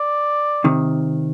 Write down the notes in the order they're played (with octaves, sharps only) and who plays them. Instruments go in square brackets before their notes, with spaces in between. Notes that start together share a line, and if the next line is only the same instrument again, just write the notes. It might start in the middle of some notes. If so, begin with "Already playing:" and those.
Already playing: [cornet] D5
[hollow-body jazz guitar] C3 D#3